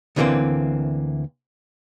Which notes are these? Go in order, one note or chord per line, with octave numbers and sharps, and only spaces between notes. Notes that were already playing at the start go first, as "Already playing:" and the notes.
D2 D3 E3 G3 A#3 C4